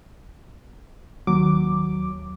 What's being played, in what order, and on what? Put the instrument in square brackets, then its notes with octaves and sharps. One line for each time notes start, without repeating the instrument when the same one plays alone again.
[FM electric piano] D#2 D6 [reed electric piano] F#3